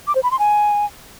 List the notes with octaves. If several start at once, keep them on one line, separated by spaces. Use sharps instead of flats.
D6
C5
B5
C6
G#5